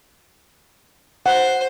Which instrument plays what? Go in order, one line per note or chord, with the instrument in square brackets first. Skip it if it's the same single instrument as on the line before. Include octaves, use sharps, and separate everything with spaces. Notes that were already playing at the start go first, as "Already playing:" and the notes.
[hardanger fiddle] C5 [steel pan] F#5